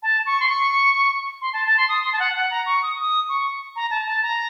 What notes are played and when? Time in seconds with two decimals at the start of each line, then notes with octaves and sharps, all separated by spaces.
0.03 A5
0.26 C#6
0.40 C6
0.49 C#6
1.41 C6
1.53 A5
1.66 A5
1.77 C6
1.89 D#6
2.05 C6
2.12 A5
2.20 F#5
2.35 F#5
2.51 A#5
2.66 C#6
2.83 D#6
3.00 D#6
3.29 C#6
3.76 A#5
3.90 A5
4.06 A5
4.22 A#5